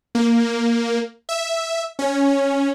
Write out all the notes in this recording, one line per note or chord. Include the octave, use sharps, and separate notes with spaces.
A#3
E5
C#4